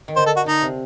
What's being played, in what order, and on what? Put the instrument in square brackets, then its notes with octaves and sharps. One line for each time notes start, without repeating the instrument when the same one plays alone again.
[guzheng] D#3
[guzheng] D3 [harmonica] C5
[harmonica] A4
F#4
[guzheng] D3 [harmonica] D#4
[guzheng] C3